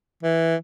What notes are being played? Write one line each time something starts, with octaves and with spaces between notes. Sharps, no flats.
E3